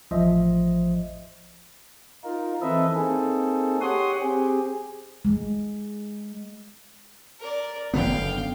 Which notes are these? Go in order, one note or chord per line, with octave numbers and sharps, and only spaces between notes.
A1 F3 C5 D#5 E5
D#4 F4 A#4
E3 C4 A4 B4 D#5 E5
A#3 C4 D#4 G#4 A4
G4 C#5 F#5 C6 D#6
C4 G4 G#4
G#3
A#4 D5
F#1 D3 B3 F5 G5